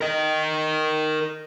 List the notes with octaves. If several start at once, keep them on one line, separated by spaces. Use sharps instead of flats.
A#4 D#5